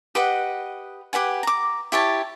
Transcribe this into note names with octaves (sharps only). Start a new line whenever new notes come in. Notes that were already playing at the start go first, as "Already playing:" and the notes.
G4 B4 D#5 F#5
G4 B4 F#5 G#5
A#5 D6
E4 G4 C#5 A5